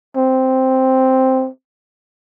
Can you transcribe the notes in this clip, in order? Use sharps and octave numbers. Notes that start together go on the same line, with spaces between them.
C4